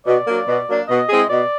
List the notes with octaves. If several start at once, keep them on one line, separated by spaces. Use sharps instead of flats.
B2 D5
F#3 A#3 D4
B2
F#3 A#3 D4
B2 D#5
G#3 C4 E4 G#4
B2 D5